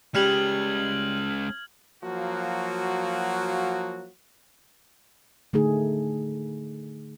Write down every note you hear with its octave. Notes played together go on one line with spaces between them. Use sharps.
G3 G#3 C#4 F6 G#6 F#7
F3 F#3 A#3 F#4
D3 A3 D#4 G#4